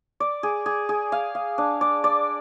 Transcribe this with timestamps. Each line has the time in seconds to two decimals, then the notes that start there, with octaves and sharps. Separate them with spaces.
0.20 D5
0.43 G#4
0.66 G#4
0.89 G#4
1.12 F5
1.35 F5
1.58 D4
1.81 D5
2.04 D5